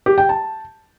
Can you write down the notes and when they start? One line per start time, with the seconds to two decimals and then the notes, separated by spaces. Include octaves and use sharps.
0.06 G4
0.18 G5
0.29 A5